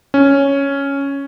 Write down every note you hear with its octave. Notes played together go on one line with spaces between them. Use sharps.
C#4